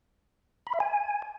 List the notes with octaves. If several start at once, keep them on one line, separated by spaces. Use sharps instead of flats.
B5
E5
G#5